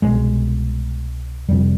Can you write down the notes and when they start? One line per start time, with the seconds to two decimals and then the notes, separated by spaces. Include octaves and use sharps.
0.02 C2 B2 G#3
1.48 F1 F2 C3 G3